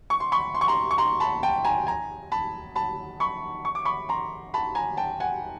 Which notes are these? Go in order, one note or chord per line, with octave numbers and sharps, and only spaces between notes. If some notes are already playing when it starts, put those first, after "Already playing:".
C#6
C6
B5 C#6
C6
C#6
A#5 C6
C#6
A#5 C6
A5 B5
G5 A5
G#5 A#5
G#5 A#5
A5 B5
A5 B5
B5 C#6
C#6
D6
B5 C#6
A#5 C6
A5 B5
G#5 A#5
G5 A5
F#5 G#5